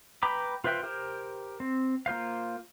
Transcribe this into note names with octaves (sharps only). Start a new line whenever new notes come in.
B4 G5 A#5 B5 D6
F4 B4 C5 E5 G5
G4 A#4 C5
C4
A#3 F4 C5 F5